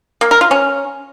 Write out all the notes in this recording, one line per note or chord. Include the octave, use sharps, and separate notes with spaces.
A#3
A#4
F4
C#4